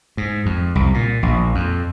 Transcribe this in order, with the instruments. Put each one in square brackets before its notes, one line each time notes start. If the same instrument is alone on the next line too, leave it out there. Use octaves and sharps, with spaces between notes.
[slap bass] G#2
F2
C2
A#2
A#1
F2